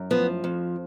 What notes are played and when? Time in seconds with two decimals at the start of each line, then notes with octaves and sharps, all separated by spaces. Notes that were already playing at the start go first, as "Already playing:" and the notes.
Already playing: F#2
0.11 F3 B3
0.44 F2